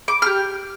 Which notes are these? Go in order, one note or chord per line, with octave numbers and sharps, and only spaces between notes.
D6
F6
G4